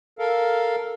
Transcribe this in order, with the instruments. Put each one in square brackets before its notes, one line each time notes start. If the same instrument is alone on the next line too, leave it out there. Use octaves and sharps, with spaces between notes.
[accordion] A4 A#4 F5